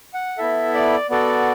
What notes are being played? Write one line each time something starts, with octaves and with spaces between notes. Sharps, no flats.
F#5
B3 E4 A4 E5
D5
B3 F#4 A4 D5